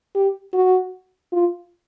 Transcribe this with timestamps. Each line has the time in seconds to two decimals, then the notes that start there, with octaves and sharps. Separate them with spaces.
0.15 G4
0.54 F#4
1.33 F4